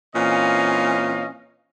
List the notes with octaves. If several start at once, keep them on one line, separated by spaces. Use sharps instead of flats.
A#2 E3 C4 C#4 D#5 F5